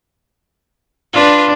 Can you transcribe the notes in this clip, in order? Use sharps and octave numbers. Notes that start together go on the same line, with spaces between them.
D4 F4 B4